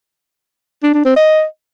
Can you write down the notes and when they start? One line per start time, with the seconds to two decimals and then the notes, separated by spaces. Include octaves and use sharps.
0.83 D4
0.94 D4
1.05 C4
1.16 D#5